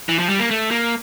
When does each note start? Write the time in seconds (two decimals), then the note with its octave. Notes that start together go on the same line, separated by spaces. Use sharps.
0.09 E3
0.19 F3
0.29 G3
0.39 A#3
0.51 A3
0.71 A#3